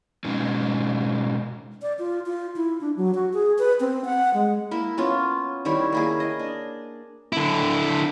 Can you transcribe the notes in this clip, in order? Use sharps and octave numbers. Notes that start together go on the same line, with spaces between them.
B2 G#3 C#4 D#4
D5
F4
F4
E4
D4
F#3
F#4
G#4
B4
C4
F#5
G#3
A#3 E4
B3 C#4 F4
D#3 G3 E4 C#5
A#3 E4 G#4
D#5
D4
D3 E4